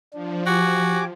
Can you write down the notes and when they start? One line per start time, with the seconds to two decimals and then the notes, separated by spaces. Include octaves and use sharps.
0.13 F3 D4
0.46 F#4 G4 G#5 D6